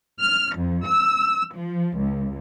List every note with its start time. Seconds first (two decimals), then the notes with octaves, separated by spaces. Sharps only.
0.21 F6
0.56 F2
0.86 E6
1.54 F3
1.97 C#2